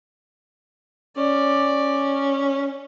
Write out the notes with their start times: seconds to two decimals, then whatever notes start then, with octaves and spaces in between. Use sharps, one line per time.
1.17 C#4 D5